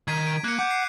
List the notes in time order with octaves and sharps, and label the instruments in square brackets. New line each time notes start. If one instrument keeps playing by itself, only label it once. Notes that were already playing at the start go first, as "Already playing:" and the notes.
[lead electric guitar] D#3 [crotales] G#6 B6 D#7
[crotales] D7
[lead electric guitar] A#3 [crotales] F#6 C#7
[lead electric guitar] F#5 [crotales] D6 G6 C#7
[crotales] C7